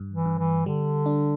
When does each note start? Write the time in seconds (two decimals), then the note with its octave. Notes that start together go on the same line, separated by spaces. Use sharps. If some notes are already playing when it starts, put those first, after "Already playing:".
Already playing: G2
0.12 E3
0.25 G2
0.39 E3
0.66 D3 G3
1.06 D4